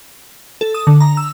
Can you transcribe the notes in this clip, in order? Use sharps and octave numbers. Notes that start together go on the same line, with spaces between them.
A4
D#6
D3
A#5
E6